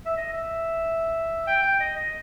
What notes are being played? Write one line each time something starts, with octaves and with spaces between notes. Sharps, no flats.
E5
D#5
E5
G5
G5
D#5
D#5